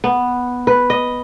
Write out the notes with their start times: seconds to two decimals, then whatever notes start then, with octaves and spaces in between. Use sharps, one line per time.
0.04 B3
0.67 B4
0.90 D#5